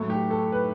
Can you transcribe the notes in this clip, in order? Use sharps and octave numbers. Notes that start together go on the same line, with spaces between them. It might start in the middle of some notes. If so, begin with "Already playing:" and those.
Already playing: A2 F#3 A3
G4
A4
B4